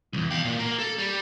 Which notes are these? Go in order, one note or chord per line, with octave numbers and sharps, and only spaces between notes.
B1 E2
F5 G5
A#2
A#3
A4
G3